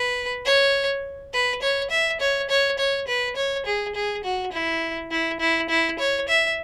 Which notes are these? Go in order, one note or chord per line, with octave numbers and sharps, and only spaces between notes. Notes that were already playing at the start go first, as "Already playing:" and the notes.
Already playing: B4
C#5
B4
C#5
E5
C#5
C#5
C#5
B4
C#5
G#4
G#4
F#4
E4
E4
E4
E4
C#5
E5